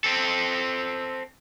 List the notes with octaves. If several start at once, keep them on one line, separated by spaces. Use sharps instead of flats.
C4 A4